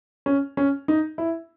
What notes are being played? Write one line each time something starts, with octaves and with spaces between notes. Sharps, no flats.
C#4
C#4
D#4
E4